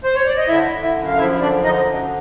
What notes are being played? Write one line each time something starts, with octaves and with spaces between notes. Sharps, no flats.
C5
C#5
D5
D#5
D3 E4 E5
D3
E4 E5
F#2
F5
F3 E4 E5
D3 D4 D5
D3 D#4 D#5
F#2